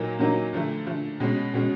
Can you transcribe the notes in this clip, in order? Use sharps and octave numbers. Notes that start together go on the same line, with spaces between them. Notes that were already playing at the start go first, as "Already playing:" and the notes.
Already playing: A#2 F#3 A#3 D#4
A#2 F#3 A#3 D#4
D3 F3 A3
D3 F3 A3
B2 G#3 C#4
B2 G#3 C#4